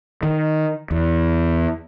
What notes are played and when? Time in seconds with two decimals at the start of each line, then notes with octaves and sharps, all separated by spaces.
0.23 D#3
0.91 E2